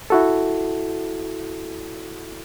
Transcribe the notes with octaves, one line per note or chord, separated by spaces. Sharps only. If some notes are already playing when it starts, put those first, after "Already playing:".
E4 F#4 A4